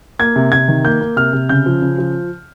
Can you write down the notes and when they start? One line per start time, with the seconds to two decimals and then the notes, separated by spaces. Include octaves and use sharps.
0.19 A#3 G#6
0.36 C3
0.52 C3 G#6
0.68 D#3
0.84 A#3 G6
1.01 A#3
1.16 C3 F6
1.33 C3
1.49 C#3 G6
1.66 F3
1.82 C#3
1.98 F3